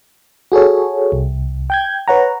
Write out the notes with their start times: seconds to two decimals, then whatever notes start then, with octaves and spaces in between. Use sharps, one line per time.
0.52 F#4 G#4 A4 C#5
1.12 C2
1.70 G5 G6 G#6
2.08 B4 C#5 F#5 A#5